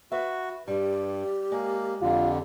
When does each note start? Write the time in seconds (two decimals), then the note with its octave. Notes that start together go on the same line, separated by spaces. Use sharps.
0.12 F#4 B4 E5
0.68 G2 G3 G4
1.52 G#3 A#3
2.02 F2 D3 F4